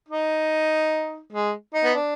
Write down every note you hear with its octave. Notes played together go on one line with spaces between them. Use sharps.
D#4
G#3
D#4
B3
D4